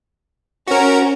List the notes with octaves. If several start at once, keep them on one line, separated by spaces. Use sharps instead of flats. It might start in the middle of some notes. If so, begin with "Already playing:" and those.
C#4 F#4 A#4